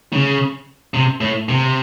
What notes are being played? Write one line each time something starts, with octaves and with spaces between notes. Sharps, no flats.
C#3
C3
A2
C3